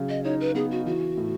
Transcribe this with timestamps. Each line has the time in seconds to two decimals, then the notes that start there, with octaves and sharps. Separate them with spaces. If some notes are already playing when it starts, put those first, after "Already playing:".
Already playing: C#3 F#3
0.09 D#5
0.24 D#4 C#5
0.40 B4
0.55 B3 G#4
0.71 F#4
0.86 E3 F#4
1.17 A2